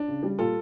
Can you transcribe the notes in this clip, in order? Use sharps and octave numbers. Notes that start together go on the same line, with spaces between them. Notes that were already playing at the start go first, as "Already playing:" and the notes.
Already playing: D4
C#3
G3
A#2 F4 A4